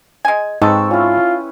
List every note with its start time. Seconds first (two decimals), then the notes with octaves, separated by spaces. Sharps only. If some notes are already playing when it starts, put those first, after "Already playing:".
0.25 G#3 G#5
0.62 G#2 C4 A4 B4 D#5 A5 C#6
0.91 C#4 E4 F4